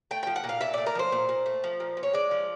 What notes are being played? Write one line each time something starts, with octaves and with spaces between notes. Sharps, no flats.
A3 G5
F3 G5
F#5
A#2
F5
A#2 E5
A3 D5
A#4
F3 C5
A#2
A#2
A3
F3
A#2
A#2
C#5
G#3 D5
F3